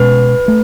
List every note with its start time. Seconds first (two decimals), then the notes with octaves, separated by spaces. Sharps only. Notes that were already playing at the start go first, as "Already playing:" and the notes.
Already playing: B2 G#3 C#4 B4
0.48 A3